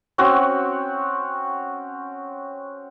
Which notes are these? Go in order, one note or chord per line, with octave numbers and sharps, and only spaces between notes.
C4 C#4 F#4